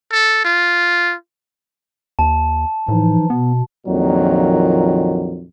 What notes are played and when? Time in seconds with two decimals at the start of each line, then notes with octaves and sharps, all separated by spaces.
0.12 A4
0.45 F4
2.19 D#2 A5
2.88 A2 E3 F3 D#4
3.30 B2 B3
3.87 A#1 F2 A#2 D#3 F#3